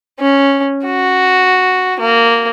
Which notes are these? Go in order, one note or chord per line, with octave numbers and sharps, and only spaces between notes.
C#4
F#4
A#3